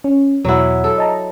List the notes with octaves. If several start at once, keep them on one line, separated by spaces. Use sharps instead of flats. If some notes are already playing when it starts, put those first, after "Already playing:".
C#4
E2 B2 F#3 E4 F#5
A4
D#5 A5 A#5